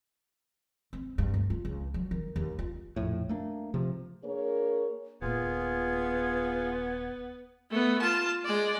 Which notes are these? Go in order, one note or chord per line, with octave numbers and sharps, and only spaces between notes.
C4
G2
D2
F4
C#2
F#3
D#3
D#2
F4
A#1 F2 A2
A3 A#3 D4
C3 F3
A#3 D4 G#4 A#4 C#5
D#1 A#2 B3 F4 G#4 G#6
A3 B3
F4 A5
G#3 D5